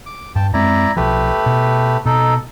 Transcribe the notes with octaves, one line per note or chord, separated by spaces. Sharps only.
D6
G2 G5 A5
F#2 G#3 C4 E4 D5 A#5
B1 F3 A3 G4 B4
B2
B2 D#4 A4